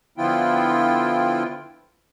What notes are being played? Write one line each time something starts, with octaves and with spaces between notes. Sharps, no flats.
D3 F3 B3 E4 F4 G5